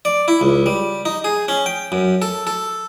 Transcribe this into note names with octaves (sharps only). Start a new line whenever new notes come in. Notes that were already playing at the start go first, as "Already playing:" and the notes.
D5
E4
C#2
G3
D#4
G#4
C#4
G5
F#2
A4
A4